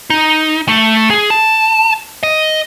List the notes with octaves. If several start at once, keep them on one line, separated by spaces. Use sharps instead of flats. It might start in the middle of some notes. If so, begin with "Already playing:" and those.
D#4
A3
G#4
A5
D#5